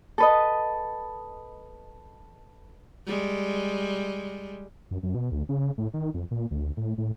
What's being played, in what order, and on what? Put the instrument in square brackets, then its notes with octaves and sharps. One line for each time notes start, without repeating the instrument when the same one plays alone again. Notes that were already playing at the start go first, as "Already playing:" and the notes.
[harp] A4 B4 D#5
[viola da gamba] G3 G#3
[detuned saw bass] F#2
F#2
B2
D2
C#3
A2
D#3
F2
A#2
D2
A2
A2